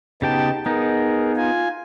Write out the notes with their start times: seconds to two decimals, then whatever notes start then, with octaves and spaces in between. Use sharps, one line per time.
0.22 C#3 B3 D#4 G4 G5 A5
0.66 B3 D#4 G#4 A#4
1.37 F4 G#5